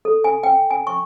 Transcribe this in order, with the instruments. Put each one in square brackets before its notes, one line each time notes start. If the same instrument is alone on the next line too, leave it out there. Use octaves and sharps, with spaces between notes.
[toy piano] A4
G#5
G5
G#5
C#6